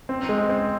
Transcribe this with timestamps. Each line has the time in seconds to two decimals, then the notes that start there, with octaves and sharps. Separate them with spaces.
0.09 C4
0.29 G#3
0.49 C4